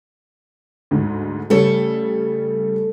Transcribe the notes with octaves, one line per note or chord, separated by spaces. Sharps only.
D2 G#2
C#3 G3 A3 A4 C#5